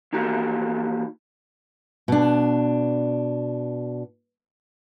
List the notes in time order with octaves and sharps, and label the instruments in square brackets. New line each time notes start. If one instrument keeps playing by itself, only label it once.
[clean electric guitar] E3 A#3 D#4 F#4 G4
[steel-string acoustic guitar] B2 D4